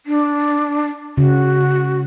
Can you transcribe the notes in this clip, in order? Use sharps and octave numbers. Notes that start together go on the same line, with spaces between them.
D4
C#3 F#4